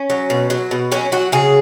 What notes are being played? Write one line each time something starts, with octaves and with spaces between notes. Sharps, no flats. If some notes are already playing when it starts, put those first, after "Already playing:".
Already playing: C#4
F#3
B2
F#3
B2
F#3 C#4
F#3 F#4
C#3 G#4